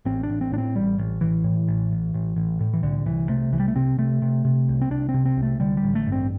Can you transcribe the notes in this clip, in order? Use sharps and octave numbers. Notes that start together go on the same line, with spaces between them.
A1 C4
D4
A1
C4
A2 D4
C4
A1 G3
A1
A1 E3
A2
A1
A1
A1
A1
A2
E3
C2 D3
C2 E3
C3 A3
C2 E3
G3
A3
C3 C4
C3 A3
C3
C3
C2
C4
C2 D4
C4
C3
C4
C2
A3
D3 G3
G3
A1
A3
G2
C4